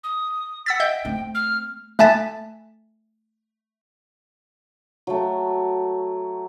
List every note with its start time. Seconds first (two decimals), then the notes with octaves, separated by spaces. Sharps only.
0.04 D#6
0.66 F#5 E6 A6 B6
0.80 D#5 E5 G5 G6
1.05 A3 C4
1.35 F6
1.99 A3 E5 G#5 A5 A6 B6
5.07 F#3 A3